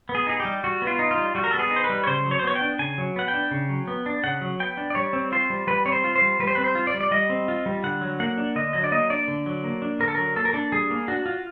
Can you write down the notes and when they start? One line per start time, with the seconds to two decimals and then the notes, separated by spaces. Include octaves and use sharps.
0.09 B3
0.15 G#4
0.27 D#4 G#4
0.40 G4
0.45 G3
0.64 G3 F#4
0.82 B3
0.87 F4
0.99 D#4
1.11 F4
1.18 G3
1.35 G3 F#4
1.44 A#4
1.51 A4
1.54 B3
1.59 G#4
1.71 D#4
1.76 C5
1.84 B4
1.89 G3
2.04 C#5
2.07 C#3 C5
2.26 F#3
2.31 C#5
2.39 C5
2.44 B3 C#5
2.55 G5
2.61 D4
2.79 C#3 G#5
2.98 F#3
3.16 B3 F#5
3.28 G5
3.34 D4
3.51 C#3
3.69 F#3
3.88 B3
4.06 D4
4.24 C#3 F#5
4.41 F#3
4.60 B3 G5
4.77 D4
4.90 D5
4.95 G3 C#5
5.13 C4
5.32 F4 C5
5.50 G3
5.67 G3 B4
5.86 C4 C#5
5.92 C5
6.04 F4
6.16 C5
6.22 G3
6.40 G3 B4
6.47 C5
6.55 C4 B4
6.64 C5
6.75 F4
6.87 D5
6.94 G3
7.01 D5
7.11 G3 D#5
7.30 C4
7.48 F4
7.66 G3
7.84 D3 F#5
8.01 F#3
8.20 A#3 F#5
8.38 D4
8.56 D3 D#5
8.73 F#3 D#5
8.84 D5
8.92 A#3 D#5
9.10 D4 D5
9.28 D3
9.46 F#3
9.64 A#3
9.82 D4
9.99 D3 A#4
10.08 A4
10.15 F#3 A#4
10.36 A#3 A4
10.45 A#4
10.53 D4 A4
10.72 G3 G#4
10.90 A#3
11.08 D4 F#4
11.26 F4